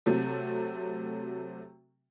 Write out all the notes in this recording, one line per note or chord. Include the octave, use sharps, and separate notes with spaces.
C3 F#3 A3